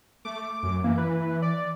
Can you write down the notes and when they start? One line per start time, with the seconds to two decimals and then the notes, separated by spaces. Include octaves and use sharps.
0.25 A3 D6
0.63 F#2
0.84 E3 A#3
0.98 B4
1.42 D5